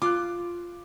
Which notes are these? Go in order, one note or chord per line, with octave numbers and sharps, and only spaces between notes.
F4 D6 F#6